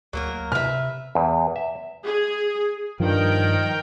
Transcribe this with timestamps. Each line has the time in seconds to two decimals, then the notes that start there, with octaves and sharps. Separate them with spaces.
0.13 D2 F#3 A#3 A#4
0.52 C3 B4 E5 F6
1.15 E2
1.56 E5
2.03 G#4
3.00 G2 D#3 F3 A#4 G5